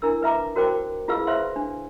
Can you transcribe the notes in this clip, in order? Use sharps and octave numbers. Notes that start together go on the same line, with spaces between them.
D4 E4 A#4 E6
B4 E5 A#5 D6
F#4 A#4 C5 G5 D6
E4 F4 G#4 B4 F5 E6
B4 C5 E5 F5 C6
D4